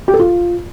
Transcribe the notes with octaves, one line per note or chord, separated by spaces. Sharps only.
G4
A4
F4